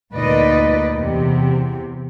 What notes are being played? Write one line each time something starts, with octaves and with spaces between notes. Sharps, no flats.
D2 A#2 D#4 B4 D5 D#5
E2 C3